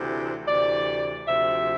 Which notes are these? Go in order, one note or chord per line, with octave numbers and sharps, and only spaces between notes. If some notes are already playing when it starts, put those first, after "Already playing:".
Already playing: D2 C3 E3
D2 C3 E3 D5
D2 C3 F3 E5